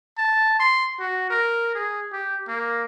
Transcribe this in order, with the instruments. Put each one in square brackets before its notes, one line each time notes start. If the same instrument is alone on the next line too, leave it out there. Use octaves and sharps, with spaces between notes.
[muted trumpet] A5
C6
F#4
A#4
G#4
G4
A#3